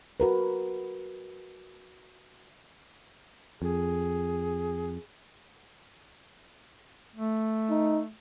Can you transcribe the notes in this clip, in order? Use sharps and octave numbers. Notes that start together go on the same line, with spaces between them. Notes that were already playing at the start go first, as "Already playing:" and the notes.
F#4 A#4 B4
F2 G#4
A3
D#4